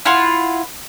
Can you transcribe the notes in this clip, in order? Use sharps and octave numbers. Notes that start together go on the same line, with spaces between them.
E4 F4 F#5 C6